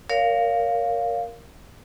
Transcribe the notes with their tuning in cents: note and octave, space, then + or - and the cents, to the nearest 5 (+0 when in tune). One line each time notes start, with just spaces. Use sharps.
A#4 +0 C#5 +30 F5 +0